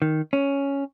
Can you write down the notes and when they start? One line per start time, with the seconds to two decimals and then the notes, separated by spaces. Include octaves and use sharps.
0.02 D#3
0.33 C#4